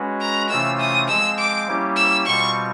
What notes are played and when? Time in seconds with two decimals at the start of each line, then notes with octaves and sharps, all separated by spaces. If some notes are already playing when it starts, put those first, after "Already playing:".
Already playing: G#3 C#4 F#4 B4
0.21 A#5
0.49 C3 E3 A3 C#4 F4 E6
0.80 D#6
1.08 F3 G#3 C4 E6
1.38 D6
1.67 G3 A#3 C#4 E4 G4
1.96 E6
2.26 B2 G3 C4 F4 C#6